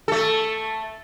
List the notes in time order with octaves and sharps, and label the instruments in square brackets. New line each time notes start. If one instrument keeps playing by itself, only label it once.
[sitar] A3 A4